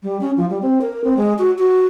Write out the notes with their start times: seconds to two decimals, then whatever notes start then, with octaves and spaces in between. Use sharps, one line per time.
0.03 G3
0.21 C#4
0.37 F3
0.50 G3
0.62 C4
0.81 A#4
1.04 C4
1.17 G#3
1.38 F#4
1.58 F#4